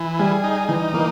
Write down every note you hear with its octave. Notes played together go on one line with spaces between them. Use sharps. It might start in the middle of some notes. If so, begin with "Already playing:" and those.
Already playing: E3
G3 G#4
D#4
E3 D#4
E3 A#3